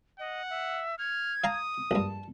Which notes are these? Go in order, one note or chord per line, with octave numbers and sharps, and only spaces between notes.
D#5 F#5
E5
F6 G#6
F5 A5 A#5 D#6
A#1 G2 A5